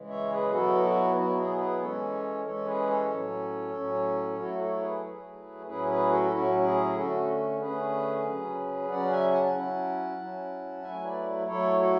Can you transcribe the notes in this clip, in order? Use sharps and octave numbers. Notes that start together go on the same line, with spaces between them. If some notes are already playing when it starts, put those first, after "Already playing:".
Already playing: C#3 E3 G#3
C#5 E5
G#4 B4
B2 F#3 B3 E4 F#4 A4
F#4
B2 F#3 B3 E4 F#4
G#4
G#4 B4
E3 G#3 C#4 A4 C#5
E3 G#3 C#4 A4 C#5
G#4 B4
A4 C#5
A2 F#3 C#4
A2 F#3 C#4
F#3 A3 E4 F#4 A4
A4 C#5
G#4 B4
F#3 A3 E4 G#4 B4
A2 F#3 C#4 E4 G#4 B4
G#4 B4
F#4 A4
A2 F#3 C#4 E4 F#4
G#4
D3 A3 C#4 F#4 A4
D3 A3 C#4 G#4 B4
C#3 F#3 C#4
C#3 F#3 C#4 D5 F#5
E5 G#5
F#5 A5
F#3 C#4 E4
F#3 C#4 E4
F#3 A3 E4 E5 G#5
B4 D5
F#3 A3 E4 A4 C#5
F#4 A4